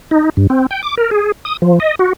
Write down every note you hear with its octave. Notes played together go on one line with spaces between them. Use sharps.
D#4
G2
C4
G5
D6
A#4
G#4
D#6
F3
D#5
F#4